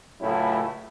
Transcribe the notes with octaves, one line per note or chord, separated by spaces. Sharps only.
C#2 A2 F#3 A3 C#4 E4